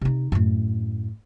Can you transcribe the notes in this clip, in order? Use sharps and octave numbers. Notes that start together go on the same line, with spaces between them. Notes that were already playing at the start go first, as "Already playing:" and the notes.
C3 D#4
F#2 A2